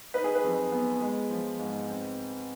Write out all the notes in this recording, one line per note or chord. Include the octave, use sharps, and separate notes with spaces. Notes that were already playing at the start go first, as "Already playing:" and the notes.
D#4 B4
G#4
B4
F2
B3
G#3
F3
G#2
C4